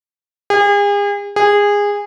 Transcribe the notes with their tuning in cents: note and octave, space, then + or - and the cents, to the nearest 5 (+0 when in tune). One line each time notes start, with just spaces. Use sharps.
G#4 -40
G#4 -20